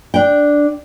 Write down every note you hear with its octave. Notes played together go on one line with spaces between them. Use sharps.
D4 G5